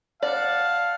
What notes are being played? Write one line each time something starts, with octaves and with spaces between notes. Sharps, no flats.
D5 F5 F#5 A5